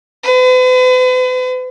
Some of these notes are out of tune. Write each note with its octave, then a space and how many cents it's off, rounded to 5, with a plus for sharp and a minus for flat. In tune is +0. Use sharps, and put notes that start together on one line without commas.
B4 +45